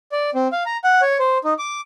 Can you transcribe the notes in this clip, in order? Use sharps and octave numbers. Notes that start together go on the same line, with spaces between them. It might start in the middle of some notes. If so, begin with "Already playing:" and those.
D5
C4
F5
A#5
F#5
C#5
C5
D#4
D6